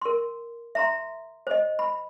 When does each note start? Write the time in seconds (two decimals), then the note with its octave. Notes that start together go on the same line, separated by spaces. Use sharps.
0.02 A#4 C6
0.75 E5 A#5 C6
1.47 C5 D#5
1.79 B5